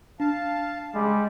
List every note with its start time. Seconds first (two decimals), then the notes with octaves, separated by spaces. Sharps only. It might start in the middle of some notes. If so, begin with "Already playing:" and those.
0.20 D4 F5 A5
0.95 C#3 G3 G#3